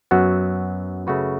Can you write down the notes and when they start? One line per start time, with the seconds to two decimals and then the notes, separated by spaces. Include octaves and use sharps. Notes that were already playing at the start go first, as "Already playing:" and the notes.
0.11 F#2 F#3 B3 F#4
1.07 F#2 C#3 A3 F#4 B4